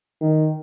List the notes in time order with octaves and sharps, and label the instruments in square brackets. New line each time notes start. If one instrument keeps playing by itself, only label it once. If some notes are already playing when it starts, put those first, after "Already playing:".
[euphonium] D#3